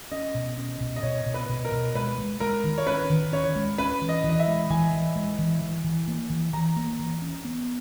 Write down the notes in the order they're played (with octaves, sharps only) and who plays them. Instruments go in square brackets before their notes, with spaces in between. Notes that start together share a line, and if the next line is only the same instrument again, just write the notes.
[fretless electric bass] C#4 [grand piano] D#5
[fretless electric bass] B2
C#4
B2
[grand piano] D#5
[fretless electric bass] B2 [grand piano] C#5
[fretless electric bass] B2
[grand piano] B4
[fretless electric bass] B2
[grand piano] A#4
[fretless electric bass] B2
[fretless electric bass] G#3 [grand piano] B4
[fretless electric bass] G#3
[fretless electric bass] G#3 [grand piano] A#4
[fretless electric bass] D#3
[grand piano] C#5
[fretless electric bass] C#4 [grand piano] B4
[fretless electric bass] D#3
[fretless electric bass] C#4 [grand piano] C#5
[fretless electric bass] G#3
[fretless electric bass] C#4 [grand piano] B4
[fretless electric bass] E3
[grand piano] D#5
[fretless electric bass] E3
[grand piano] D#5
E5
[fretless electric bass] G#3
[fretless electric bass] E3 [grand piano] G#5
[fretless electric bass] E3
G#3
E3
E3
E3
A#3
E3
[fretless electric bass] E3 [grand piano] A#5
[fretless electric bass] A#3
E3
C#4
B3